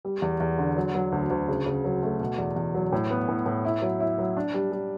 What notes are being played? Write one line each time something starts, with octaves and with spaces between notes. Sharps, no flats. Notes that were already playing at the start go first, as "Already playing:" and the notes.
G3
E2
E2
D3
F#3
F#3
D2
D2
C#3
C#3
F#3
A3
B2
E2
E2
F#3
A2
B3
A2
A2
E4
F#3
E4
F#3
D4
G3
G3